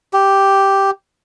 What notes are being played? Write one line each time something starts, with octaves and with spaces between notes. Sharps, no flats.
G4